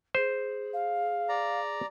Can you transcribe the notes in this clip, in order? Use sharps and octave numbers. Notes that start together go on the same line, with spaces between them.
G#4 C5
F5
D5 A#5